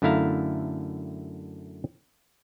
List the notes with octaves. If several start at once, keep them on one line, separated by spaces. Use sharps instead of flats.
F#2 D3 A3 E4 F5 A#5